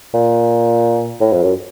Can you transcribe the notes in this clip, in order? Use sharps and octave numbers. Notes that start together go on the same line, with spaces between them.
A#2
A2
F2
F#2